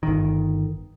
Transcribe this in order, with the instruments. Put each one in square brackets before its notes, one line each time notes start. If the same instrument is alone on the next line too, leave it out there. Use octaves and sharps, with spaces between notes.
[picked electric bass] G1 D#3